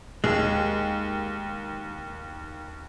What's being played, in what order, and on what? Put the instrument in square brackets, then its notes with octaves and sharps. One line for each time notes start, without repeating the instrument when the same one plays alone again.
[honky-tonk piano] D#2 [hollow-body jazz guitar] G#3